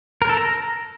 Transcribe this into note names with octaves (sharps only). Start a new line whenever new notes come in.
A#4
A4
A#5